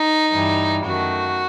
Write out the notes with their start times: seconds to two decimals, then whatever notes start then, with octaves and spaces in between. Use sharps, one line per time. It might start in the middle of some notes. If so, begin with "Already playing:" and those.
Already playing: D#4
0.31 G2 E3 G3
0.84 F#2 D#3 A3 F#4